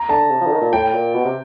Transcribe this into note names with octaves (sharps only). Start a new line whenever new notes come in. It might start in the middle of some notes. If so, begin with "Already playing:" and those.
Already playing: A#5
D3 A5
C3
F3
D3
D#3
A#2
A2 G5
A#2
B2
C3